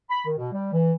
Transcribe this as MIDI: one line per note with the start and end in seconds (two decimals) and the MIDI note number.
0.10 0.23 83
0.25 0.38 51
0.38 0.49 47
0.52 0.72 55
0.72 0.93 52